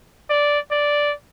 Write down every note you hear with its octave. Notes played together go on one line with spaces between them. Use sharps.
D5
D5